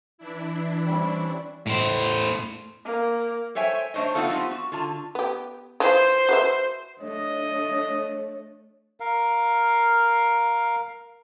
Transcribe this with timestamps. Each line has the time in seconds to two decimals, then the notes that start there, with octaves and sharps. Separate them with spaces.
0.18 E3 D4 E4
0.87 G3 C4 C#4
1.67 A2 C5
2.85 A#3
3.55 A4 C5 C#5 E5 G5 G#5
3.94 A3 D4 C5 C#5 D#5
4.15 A3 B3 C4 D#4 F4 A4
4.30 B3 C4 D#4 F4 G4
4.51 F#4
4.72 D3 F4 A5
5.15 B3 G4
5.80 E3 F3 C5
6.29 F#4 B4 E5
7.00 A3 D4 C#5 D#5
9.00 A#4 F5